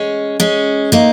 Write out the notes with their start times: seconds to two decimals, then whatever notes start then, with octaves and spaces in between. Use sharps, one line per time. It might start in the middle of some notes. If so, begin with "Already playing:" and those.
Already playing: G#3 C#4
0.40 G#3 C#4
0.92 A#3 D#4